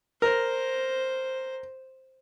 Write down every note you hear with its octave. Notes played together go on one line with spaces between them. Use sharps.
A#4 C5